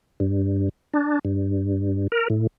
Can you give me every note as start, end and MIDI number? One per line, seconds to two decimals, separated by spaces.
0.20 0.69 43
0.94 1.19 62
1.25 2.07 43
2.12 2.28 70
2.30 2.47 45